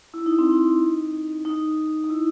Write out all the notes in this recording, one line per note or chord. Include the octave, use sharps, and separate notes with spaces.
E4
D#4
C4
D#4
D#4
D#4
E4